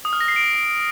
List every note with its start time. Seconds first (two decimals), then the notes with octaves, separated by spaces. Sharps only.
0.05 D#6
0.13 F6
0.21 A#6
0.28 C7
0.36 D7